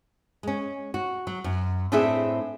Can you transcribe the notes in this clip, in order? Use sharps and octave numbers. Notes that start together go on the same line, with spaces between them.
G#3 C#4
F#4
F#3
F#2
A2 C4 D4 G#4 A4 E5